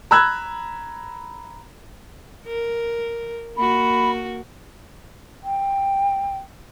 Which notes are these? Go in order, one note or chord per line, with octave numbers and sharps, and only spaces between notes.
A#5 B5 E6 F#6 G#6
A#4
A#3 F#4 B5
G5